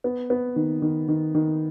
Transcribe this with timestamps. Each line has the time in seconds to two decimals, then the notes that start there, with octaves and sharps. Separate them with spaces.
0.04 B3
0.30 B3
0.56 D#3
0.82 D#3
1.08 D#3
1.35 D#3